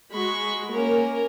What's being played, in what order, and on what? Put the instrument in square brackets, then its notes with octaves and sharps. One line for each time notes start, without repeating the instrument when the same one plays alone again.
[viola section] G#3 F#4 [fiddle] B5 C#6
[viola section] A#3 [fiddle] C#4 A#4